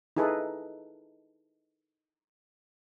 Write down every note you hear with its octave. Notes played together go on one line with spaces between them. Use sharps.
D#4 E4 G#4 A4 B4